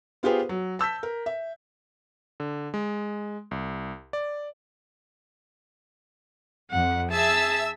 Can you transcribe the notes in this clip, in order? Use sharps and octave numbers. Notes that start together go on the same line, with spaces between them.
B3 F4 G4 G#4 C5
F#3
A5 E6 G6 B6
A#4
E5
D3
G#3
C2
D5
F2 F#5
G#4 E5 A5 E6